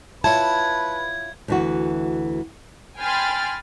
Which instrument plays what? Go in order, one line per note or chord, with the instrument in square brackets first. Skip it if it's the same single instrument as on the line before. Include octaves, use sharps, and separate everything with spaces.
[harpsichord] E4 F4 C#5 [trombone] B4 [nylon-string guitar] A5 [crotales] G#6
[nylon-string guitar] D2 E3 F#4
[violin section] G5 G#5 B5 C6 F6 A6